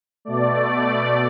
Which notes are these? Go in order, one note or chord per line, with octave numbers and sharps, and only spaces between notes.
B2 A3 D5